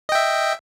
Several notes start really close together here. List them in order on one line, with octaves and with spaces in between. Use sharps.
D#5 G5 E5